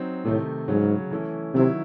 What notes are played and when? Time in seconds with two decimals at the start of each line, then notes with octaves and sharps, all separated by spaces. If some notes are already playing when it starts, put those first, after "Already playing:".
Already playing: F#3 C4 D#4
0.25 A2 C3 D#3 A3 D#4
0.68 G#2 C#3 F#3 C#4
1.11 E3 A3 C#4 E4
1.54 C3 D#3 F#3 C#4 E4